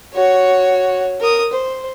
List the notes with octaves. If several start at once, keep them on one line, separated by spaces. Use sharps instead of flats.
F#4 C#5
A#4 D#6
C5